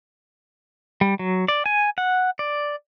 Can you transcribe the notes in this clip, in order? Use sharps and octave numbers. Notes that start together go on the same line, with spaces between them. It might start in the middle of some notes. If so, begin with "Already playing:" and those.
G3
F#3
D5
G#5
F#5
D5